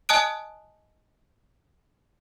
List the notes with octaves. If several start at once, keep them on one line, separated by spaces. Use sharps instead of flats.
D#5 G#5 A5 D#6 F#6 D7